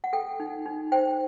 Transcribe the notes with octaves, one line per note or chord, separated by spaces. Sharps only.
F#5
A4 G5
D#4
D#4
C5 G5